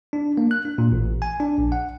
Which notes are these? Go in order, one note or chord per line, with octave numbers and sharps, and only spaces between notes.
D4
A#3
F#6
D4
A#2
A1
G#5
D4
A#1
F#5